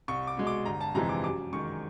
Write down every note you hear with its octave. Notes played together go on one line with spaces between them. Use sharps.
C2 C#6
D6
B2 G#3
D6
G1 A#5
A5
F2 C3 E3 G#3 A#5
D6
F#2 D6
D#3 G#3 C#6